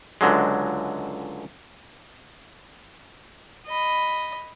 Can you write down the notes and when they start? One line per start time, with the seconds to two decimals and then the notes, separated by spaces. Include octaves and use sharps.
0.21 C#2 D3 F#3 G#3
3.68 D#5 B5